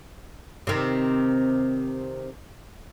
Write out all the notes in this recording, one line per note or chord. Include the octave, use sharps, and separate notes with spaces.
C3 D#3